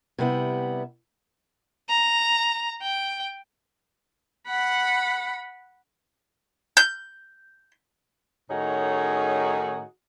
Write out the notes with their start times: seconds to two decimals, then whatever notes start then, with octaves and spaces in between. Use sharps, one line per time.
0.18 C3 G3 B3 E4
1.89 A#5
2.82 G5
4.48 F#5 B5
6.77 G6
8.50 A2 D#3 C#4 D#4 F#4 G#4